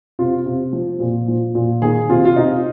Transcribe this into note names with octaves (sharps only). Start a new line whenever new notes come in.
C3 F4
C3
F3
A#2
F3
A#2
D#3 G#4
C3 F4
F4
C3 D#4